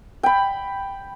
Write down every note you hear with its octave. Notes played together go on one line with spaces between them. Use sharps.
G5 B5